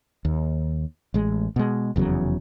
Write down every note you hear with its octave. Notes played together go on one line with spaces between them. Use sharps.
D#2
A1 G#3
B2 G#3
F1 E2 C#3 F#3